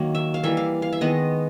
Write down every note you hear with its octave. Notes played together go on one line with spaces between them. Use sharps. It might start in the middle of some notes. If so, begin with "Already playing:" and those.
Already playing: D#3 F#3 A#3
E5
F5
E3 G3 A#3 E5
F5
F5
E5
D#3 G#3 B3 D#5